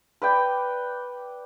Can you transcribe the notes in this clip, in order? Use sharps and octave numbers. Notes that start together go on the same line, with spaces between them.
B4 D5 G5